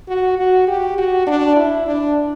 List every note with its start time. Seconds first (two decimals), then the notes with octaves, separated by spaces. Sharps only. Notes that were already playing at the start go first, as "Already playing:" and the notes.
0.08 F#4
0.38 F#4
0.67 G4
0.98 F#4
1.27 D4
1.56 E4
1.87 D4